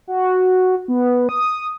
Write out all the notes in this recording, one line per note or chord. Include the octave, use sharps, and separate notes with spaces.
F#4
B3
D#6